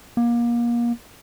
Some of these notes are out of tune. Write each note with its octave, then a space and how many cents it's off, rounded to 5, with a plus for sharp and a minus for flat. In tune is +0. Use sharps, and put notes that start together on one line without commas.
A#3 +30